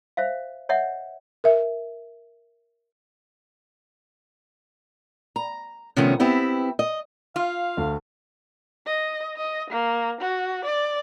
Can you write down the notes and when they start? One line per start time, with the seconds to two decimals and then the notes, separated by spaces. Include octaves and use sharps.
0.17 C5 E5 F5
0.69 C#5 D#5 E5 F#5
1.44 A#4 E5
5.36 A#5
5.96 C3 D#3 F3 A3 B3 C#4
6.20 B3 C4 E4 G4
6.79 D#5
7.36 F4 F5
7.77 D2
8.87 D#5
9.37 D#5
9.70 A#3
10.21 F#4
10.65 D5